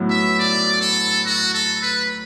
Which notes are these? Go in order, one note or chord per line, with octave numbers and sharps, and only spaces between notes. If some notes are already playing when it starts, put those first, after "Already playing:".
Already playing: A2 F#3 B3
E5
D5
A4
F#4
A4
B4